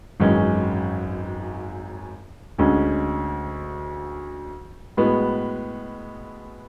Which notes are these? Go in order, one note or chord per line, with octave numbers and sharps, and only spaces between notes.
G#1 F#2 E3 G#3 C#4
D2 D3 G#3 C#4
A2 G#3 B3 F#4